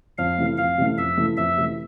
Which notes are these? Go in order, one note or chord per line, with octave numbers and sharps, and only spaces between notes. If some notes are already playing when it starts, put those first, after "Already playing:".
F2 F5
C3 E3 A3
F2 F5
C3 E3 A3
F2 E5
C3 E3 A3
F2 E5
C3 E3 A3